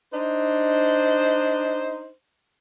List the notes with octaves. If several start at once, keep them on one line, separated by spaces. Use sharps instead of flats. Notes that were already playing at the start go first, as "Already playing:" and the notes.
D4 D#4 C5